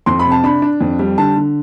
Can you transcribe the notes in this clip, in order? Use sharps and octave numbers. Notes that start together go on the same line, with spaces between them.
F2 C6
B5
C3
A5
D4 B5
D4
F2
G3
D3 A5
D3